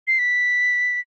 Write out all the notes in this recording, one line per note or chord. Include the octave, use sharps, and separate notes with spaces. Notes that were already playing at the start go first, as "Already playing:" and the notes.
C7
B6